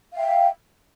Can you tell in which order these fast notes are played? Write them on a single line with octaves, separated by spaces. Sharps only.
F5 G5 E5